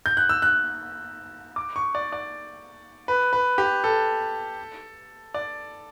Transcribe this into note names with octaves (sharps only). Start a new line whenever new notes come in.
G6
F#6
E6
F#6
D6
C#6
D5
D5
B4
B4
G4
A4
D5